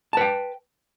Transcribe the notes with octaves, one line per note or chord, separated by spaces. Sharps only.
B4 G5 A5